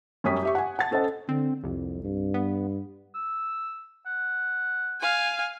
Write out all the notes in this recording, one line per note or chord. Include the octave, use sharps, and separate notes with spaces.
F#2 G3 C#4 C#5 D#6 B6
G4 E5 C#6
F#5 G#5
F#5 A5 A6
C#4 A4 C5 D#5 F#5
D3 C4
C2 F2
G2
B3
E6
F#5
F5 G#5